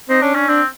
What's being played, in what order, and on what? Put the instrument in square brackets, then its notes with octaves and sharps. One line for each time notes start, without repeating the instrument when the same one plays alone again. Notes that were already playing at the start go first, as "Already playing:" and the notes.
[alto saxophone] C4 [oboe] D#4
[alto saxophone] C#4 [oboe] D4
[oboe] C#4 [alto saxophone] D4
[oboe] C4 [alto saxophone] D4